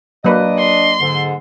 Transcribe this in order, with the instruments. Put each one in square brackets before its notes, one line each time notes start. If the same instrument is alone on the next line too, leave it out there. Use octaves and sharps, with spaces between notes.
[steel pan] F#3 A#3 B4 [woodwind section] D4 D#5
[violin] C6
[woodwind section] G#2 D3